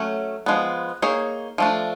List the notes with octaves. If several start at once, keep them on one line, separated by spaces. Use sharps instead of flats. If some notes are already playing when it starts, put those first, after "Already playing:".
Already playing: F#3 A3 C#4
F3 G#3 B3
A#3 D#4 G#4 C#5
F3 A3 D4